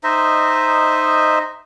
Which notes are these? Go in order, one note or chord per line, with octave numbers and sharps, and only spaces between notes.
D#4 C5 D#5 E5